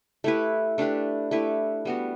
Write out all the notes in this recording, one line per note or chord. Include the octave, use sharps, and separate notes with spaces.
A3 E4 G4 B4
A3 D4 G4 B4
A3 E4 G4 B4
G3 B3 F#4